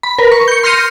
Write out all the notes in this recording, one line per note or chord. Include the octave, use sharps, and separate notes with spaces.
B5
A#4 B4
C#6
G6 C#7
C6 F6 G6 A#6 C#7 D#7